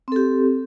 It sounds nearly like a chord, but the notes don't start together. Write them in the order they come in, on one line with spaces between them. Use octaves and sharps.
C4 A4 G4